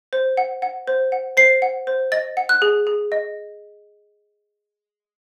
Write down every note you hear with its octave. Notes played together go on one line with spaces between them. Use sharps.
C5
F#5
F#5
C5
F#5
C5 C7
F#5
C5
D#5 A6
F#5
F#6
G#4
G#4
D#5